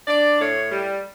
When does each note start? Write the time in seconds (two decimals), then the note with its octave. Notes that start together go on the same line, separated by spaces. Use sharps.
0.07 D4 D5
0.39 A2 C#5
0.71 G3